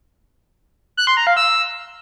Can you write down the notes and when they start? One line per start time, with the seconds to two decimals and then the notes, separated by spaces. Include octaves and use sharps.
0.97 F#6
1.07 C6
1.17 A#5
1.27 F5
1.37 E6